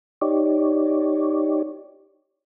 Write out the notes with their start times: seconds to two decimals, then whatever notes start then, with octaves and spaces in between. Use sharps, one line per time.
0.21 D#4 G4 C#5 D5